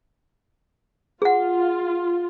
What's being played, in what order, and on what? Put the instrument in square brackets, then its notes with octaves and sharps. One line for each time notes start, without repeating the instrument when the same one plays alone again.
[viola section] F4 [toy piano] G#4 F#5